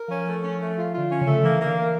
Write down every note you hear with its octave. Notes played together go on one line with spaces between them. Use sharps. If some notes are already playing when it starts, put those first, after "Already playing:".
Already playing: A#4
F3 C#4
A3
C#4
A3
F4
D3 F4
C#4
C#3
A3
E3 A#3
A#3
D3
A#4